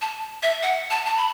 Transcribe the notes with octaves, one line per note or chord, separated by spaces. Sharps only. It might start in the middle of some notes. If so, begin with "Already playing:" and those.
A5
E5
F#5
A5
A5
B5